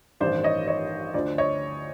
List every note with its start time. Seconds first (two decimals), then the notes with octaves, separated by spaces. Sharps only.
0.20 A1 G2 D#3 C5 D5
0.44 C#5 D#5
0.67 C#5 D#5
1.14 D2 D3 F3 C5 D5
1.38 C#5 D#5